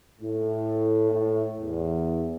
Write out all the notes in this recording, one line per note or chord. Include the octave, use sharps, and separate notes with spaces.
A2
A2
E2